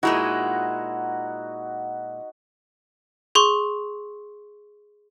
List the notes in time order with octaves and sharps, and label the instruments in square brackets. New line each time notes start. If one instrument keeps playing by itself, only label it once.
[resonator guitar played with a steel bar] A#2 G#3 E4 [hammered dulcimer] D#4 F#4
[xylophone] G#4 C6 C#6